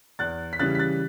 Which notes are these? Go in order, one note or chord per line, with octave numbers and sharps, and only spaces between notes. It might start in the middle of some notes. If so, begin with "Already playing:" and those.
E2 F#6 A6
B6
C#3 E3 G3 F#6 A6
B6
F#6 A6